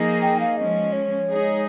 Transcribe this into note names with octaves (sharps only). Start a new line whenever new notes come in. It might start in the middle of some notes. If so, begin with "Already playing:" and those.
Already playing: F3 A#3 D#4 G#4
G5
F5
F3 G#3 C#4 D#5
C#5
G#3 D#4 G#4